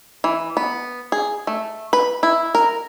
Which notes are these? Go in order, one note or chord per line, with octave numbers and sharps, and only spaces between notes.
E3
B3
G#4
A3
B4
E4
A#4